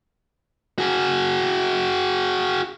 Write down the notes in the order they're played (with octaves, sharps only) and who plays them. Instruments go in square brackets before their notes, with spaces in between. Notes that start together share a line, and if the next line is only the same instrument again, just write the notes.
[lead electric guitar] F#4 G#4